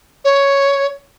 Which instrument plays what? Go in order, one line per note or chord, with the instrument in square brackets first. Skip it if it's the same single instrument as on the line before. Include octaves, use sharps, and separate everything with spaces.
[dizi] C#5